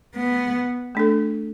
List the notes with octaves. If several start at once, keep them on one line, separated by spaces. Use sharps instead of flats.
B3
A3 D4 A4